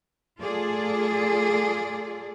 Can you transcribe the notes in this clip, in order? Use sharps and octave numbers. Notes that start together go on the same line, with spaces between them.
A3 F4 G#4 A4 D5